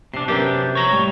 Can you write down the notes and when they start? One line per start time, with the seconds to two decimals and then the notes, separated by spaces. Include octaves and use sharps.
0.14 C3 D4 C7
0.28 F#2 C3 B3 D4 G4 A#4
0.75 C#5 A#5
0.91 A2 G3